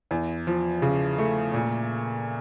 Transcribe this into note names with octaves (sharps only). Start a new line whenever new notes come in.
E2
F3
C#3
A3
A#2